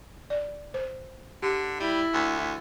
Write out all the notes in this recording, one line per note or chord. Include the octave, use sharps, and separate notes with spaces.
D5
C5
D3 G4
G3 E4
D2